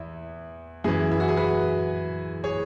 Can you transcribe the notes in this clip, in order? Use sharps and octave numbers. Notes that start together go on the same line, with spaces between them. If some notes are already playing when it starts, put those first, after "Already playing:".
Already playing: E2 E4
F#2 E3 E4 G#4
E4
F#4
G#4
F#4 B4
G#4 C#5